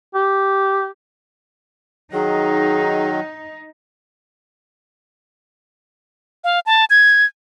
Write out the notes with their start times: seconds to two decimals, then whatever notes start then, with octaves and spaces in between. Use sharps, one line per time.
0.14 G4
2.13 D#3 F#3 D#4 G#4
6.44 F5
6.66 A5
6.90 G#6